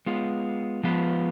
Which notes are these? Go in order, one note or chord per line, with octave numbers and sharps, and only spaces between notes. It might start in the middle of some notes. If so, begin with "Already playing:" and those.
G#3 B3 F4
F3 G#3 B3 F4 B4